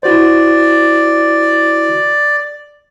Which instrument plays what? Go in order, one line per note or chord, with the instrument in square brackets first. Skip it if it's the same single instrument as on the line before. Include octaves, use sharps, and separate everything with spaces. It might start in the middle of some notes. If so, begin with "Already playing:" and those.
[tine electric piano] E4 F#4 C5 [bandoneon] D5